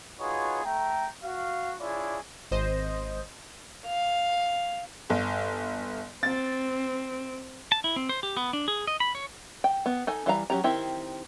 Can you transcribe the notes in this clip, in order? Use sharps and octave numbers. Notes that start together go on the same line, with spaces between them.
D#4 F4 F#4 G#4 B4 C#5
A3 G5 A#5
F#4 F5
D4 E4 F4 G#4 C#5 D5
G#1 C5 D#5
F5
G1
C4 A6
A5
E4
C4
C5
G4
B3
D4
G#4
D#5
B5
C#5
G5
B3
D#4 A4 G#5
E3 G3 F5 A#5
F#3 C#4 G4 A#5
D#3 C4 E4 G4